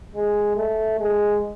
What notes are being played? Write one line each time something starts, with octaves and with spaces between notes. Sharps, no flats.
G#3
A3
G#3